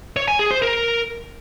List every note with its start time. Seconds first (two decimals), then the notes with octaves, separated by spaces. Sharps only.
0.16 C#5
0.28 G#5
0.39 G#4
0.51 C5
0.62 A#4